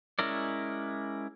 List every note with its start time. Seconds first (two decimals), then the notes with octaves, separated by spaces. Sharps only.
0.19 G#3 C#4 E4 A#4 D5